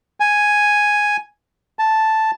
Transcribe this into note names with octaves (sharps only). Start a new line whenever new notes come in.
G#5
A5